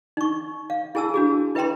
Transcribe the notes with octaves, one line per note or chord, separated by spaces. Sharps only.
D#4 C#6
F5
E4 G#4 G#5 A5 E6
D4 F#4 G#4
E4 B4 E5 G5 A#5 C6